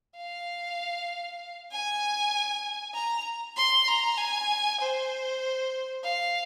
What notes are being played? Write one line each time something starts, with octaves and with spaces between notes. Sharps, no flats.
F5
G#5
A#5
C6
A#5
G#5
C5
F5